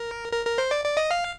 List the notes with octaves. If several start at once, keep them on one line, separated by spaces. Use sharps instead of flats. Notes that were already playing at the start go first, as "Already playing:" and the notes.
Already playing: A#4
A#4
A#4
C5
D5
D5
D#5
F5